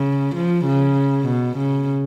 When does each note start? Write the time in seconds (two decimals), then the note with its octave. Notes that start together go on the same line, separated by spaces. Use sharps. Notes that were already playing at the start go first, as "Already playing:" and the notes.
Already playing: C#3
0.35 F3
0.65 C#3
1.27 B2
1.57 C#3